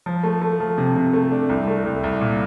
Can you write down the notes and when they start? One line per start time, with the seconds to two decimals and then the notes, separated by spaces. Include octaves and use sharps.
0.06 F3
0.24 A3
0.42 A3
0.60 F3
0.78 C3
0.96 C3
1.13 A3
1.32 D4
1.49 C2
1.67 A3
1.86 C2
2.04 C2
2.21 A#2